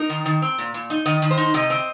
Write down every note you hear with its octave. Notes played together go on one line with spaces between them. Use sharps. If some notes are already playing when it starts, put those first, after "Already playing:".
Already playing: D#4 A#4
D#3
D#3
C4
A#2
A#2
D#4
D#3 D#5
D#3
C5
D#4
C3 D#5
C4